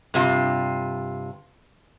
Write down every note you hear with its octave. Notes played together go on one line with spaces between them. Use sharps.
G2 C3 F4